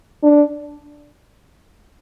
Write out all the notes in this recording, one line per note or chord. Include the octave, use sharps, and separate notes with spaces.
D4